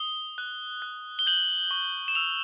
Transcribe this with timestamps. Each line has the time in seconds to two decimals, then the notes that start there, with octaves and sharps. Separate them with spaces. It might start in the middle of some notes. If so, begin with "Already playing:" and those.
Already playing: D#6 G7
0.38 F#6
0.82 F#6
1.19 G7
1.27 G6 F#7
1.71 C#6
2.08 E7
2.15 E6 F7